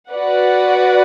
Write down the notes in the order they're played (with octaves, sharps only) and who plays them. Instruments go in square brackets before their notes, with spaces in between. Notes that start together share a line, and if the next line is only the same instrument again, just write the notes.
[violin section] F#4 B4 D5 F#5